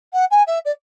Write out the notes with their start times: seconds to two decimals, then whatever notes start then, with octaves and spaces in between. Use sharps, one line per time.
0.13 F#5
0.31 G#5
0.47 E5
0.65 D5